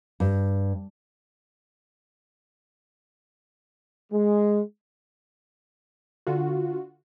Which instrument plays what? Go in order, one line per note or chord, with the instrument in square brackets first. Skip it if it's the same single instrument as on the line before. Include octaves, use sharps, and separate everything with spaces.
[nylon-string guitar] G2
[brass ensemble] G#3
[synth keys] D3 F4 F#4